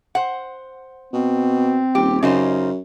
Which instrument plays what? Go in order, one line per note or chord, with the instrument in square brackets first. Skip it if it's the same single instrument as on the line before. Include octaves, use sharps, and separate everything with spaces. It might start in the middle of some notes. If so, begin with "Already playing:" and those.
[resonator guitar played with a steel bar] C5 F#5
[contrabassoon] B2 [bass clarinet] C4
[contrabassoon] D#1 [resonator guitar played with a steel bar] G4
[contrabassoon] F#2 [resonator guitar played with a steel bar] C#3 D#4 C5